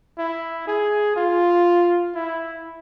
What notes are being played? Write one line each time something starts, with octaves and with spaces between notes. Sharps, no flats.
E4
G#4
F4
E4